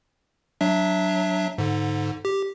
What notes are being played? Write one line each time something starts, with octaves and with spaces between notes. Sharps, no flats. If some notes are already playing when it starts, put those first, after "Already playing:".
F#3 D4 E5
G#2 D3
G4